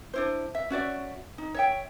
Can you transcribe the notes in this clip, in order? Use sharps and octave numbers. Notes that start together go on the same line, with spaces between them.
D4 E4 C5
E5
C#4 F#4 D5 E5
D#4
C#5 E5 G5